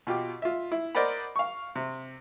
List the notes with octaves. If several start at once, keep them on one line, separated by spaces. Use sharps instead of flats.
B2 F4 G4
F4 E5
E4
A#4 C5 D5 D#5 F#5 B5
F5 C#6
C3